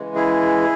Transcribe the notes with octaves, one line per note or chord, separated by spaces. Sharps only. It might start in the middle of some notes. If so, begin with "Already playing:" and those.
Already playing: C#3 E3 G#3
E4 G#4